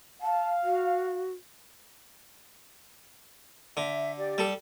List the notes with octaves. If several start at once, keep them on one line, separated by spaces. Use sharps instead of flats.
F5 A5
F#4
D3 E5
G4 D5
G3 A4